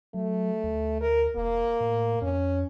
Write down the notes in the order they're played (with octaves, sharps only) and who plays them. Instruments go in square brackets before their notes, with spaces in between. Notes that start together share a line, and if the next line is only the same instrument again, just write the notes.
[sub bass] F#3 [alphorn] A3
[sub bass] D2
[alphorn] A#4
[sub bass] E1 [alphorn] A#3
[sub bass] A2
[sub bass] F2 [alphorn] C#4